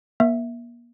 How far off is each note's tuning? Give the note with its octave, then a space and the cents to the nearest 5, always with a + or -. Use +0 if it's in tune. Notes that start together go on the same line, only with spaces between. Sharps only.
A#3 +35 E5 +0